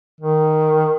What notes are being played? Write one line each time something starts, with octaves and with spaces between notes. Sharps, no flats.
D#3